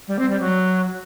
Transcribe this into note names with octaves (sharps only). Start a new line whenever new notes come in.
G3
C4
G3
F#3